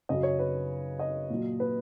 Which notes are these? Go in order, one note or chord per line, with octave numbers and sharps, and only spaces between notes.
F#2 C#3 F#3 D#5
C#5
B4
D#5
A#2 F#3
B4